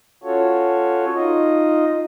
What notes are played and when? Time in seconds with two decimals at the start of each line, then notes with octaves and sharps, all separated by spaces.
0.23 C#4 F4 F#4 A4 C#5
1.15 D#4 F4 D#5